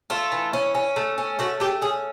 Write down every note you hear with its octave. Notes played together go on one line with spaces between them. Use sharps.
A3 F4
E3
C#4
C#4
A3
C#4
A3 F#4
A3 G4
C#4 G#4